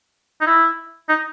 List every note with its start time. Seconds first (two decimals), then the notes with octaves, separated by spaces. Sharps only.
0.41 D#4
0.47 E4
1.09 D#4